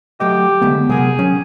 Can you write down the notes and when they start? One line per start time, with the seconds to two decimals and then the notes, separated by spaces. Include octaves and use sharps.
0.20 F#3 A3 G4 D#5
0.62 D3 G#3 A3 B3
0.89 C3 F#3 G#4 A#4 F#5
1.19 F#3 C#4